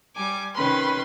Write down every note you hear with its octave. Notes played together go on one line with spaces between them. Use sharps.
G3 G#5 D6
C3 D#3 C#4 B4 B5 C6